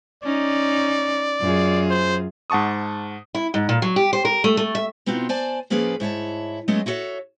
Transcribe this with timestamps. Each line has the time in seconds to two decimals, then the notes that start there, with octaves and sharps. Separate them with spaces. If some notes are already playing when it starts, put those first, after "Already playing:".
0.23 C#4 D#4 D5
1.40 F#2 F4 G#4
1.90 C5
2.50 G#2 F#5 A5 C#6 D#6
3.35 E4
3.54 G#2
3.69 A#2
3.82 F#3
3.96 G4
4.13 C5
4.25 A#4
4.44 A3
4.57 A3
4.75 E5
5.06 B2 B3 C4 D#4 F4 F#4
5.29 C5 D5 G#5 A5
5.70 F3 A#3 C#4 G#4 B4 D5
6.00 G#2 E4 C#5 A5
6.68 F#3 G#3 A3 B3 C#4 D#5
6.86 E4 F#4 A4 C#5 E5